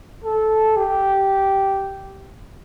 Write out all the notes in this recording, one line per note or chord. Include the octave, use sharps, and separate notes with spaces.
A4
G4